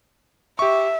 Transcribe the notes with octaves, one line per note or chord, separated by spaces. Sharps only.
G4 E5 C#6